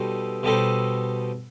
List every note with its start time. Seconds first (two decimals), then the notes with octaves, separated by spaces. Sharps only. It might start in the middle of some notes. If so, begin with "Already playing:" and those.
Already playing: B2 G3 D#4 A4 C5
0.43 B2 G3 D#4 A4 C5